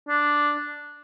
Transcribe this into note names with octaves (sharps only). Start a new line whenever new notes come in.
D4